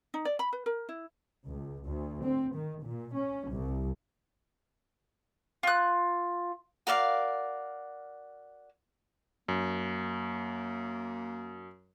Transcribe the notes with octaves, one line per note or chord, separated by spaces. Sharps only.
D#4
D5
B5
B4
A#4
E4
C#2
D2
C4
D#3
A#2
C#4
C2
F4 F#6
F#4 A#4 D5 F5
F#2 A#3